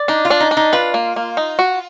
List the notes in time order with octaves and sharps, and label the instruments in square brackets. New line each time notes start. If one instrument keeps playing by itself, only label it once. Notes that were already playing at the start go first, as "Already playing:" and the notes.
Already playing: [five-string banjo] D5
[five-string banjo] D4 [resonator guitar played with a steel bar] D#4
[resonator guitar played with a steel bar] F4
[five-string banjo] D4
[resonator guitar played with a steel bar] D#4
[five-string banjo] D4
[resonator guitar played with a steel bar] D#4
[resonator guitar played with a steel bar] F4 [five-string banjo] B4
[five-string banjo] A#3
A#3
D#4
F#4